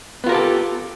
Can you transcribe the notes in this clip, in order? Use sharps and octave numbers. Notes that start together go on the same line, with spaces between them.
B3 F4 G4 A4 A#4